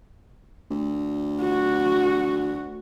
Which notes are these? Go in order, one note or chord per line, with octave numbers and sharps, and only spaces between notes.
D2
F#4